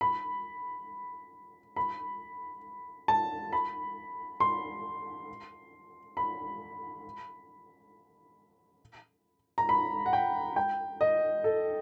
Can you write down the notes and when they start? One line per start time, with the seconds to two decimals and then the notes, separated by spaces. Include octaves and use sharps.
0.01 B5
1.76 B5
3.08 A5
3.53 B5
4.40 C6
6.17 B5
9.58 A#5
9.69 B5
10.06 F#5
10.13 G5
10.56 G5
11.01 D#5
11.44 A4